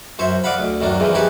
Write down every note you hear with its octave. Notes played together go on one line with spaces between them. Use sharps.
F#2 C5 C#5 E5
D5 D#5 F5 F#5 B5
D2
F#2 D#3 F#3 D4
E2 G#2 E3 F3
D#4 G4 G#4 B4 C#5 E5